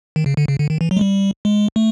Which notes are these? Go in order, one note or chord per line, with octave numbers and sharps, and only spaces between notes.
D#3
C#3
D3
C#3
D3
D#3
E3
F#3
G#3
G3
G#3
A3